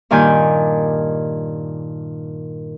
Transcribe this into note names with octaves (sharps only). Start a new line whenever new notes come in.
G2 A#2 D#3 D5 G#5 G6